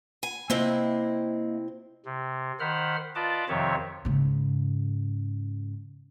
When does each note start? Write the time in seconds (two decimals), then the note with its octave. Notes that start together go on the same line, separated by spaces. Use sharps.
0.23 G#5
0.50 C3 A#3 C4 E4 D#5
2.05 C3
2.60 D#3 C5 F#5 B5 F6
3.15 F4 B4 D5 D#5 A5 D6
3.49 F2 C3 D#3 F3 C#5 E5
4.05 G#2 C#3